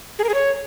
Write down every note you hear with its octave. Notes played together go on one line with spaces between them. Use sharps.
G#4
A#4
G#4
C#5